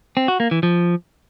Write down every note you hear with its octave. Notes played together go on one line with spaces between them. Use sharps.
C4
F#4
A#3
E3
F3